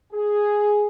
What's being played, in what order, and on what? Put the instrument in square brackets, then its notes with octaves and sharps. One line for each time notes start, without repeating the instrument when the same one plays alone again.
[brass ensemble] G#4